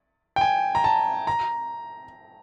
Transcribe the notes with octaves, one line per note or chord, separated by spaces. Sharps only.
G5
G#5
A#5
A5
A#5